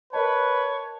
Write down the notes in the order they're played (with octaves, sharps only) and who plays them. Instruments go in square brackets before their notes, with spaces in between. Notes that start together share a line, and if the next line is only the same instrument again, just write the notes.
[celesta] A#4 D#5 A5 [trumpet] B4 [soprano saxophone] C#5